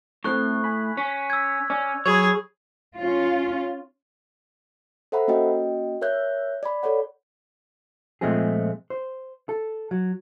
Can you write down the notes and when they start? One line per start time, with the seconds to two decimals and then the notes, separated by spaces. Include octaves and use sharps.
0.24 A2 A3 C4 A4 C#6 F#6
0.64 G#5 B5
0.97 C#4 B6
1.30 E6 G#6
1.70 C#4 D5 F6
2.06 F#3 G#4 C#5 B5 G#6
2.98 C#4 F4
5.12 A4 C5 E5 F#5 A#5 B5
5.28 A#3 C#4 F#4 D#5 G5
6.01 A#4 C#5 E5 F#6 G6
6.63 D5 B5
6.83 A4 C#5 D5 F#5
8.21 A#2 F3 G#3 A3 C4 G#4
8.90 C5
9.49 A4
9.91 F#3